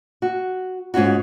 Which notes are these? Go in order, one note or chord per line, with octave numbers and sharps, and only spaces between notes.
F#4
G#2 C#4 F4 F#4